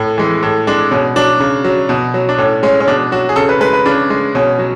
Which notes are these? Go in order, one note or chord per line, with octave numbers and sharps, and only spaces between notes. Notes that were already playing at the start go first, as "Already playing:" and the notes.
Already playing: A2
E3 G#3
A2
G#3 D4
B2 C#4
F#3 D4
C#3
F#3
B2
F#3
D4
A2 C#4
G#3 C#4
C#4
B2 D4
F#3 F#4
G#4
C#3 A4
B4
G#3 B4
B4
C#3 D4
G#3
B2 C#4
F#3